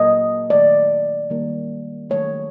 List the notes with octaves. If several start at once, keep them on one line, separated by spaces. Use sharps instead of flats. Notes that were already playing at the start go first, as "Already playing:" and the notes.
Already playing: A#2 F#3 A#3 D#5
D#3 F#3 A3 D5
D#3 G3 A#3
D#3 F#3 A3 C#5